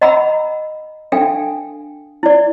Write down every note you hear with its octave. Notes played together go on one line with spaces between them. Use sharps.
D#5 F#5 A#5 B5 E6
D4 A4 F5 G5 G#5
E4 D5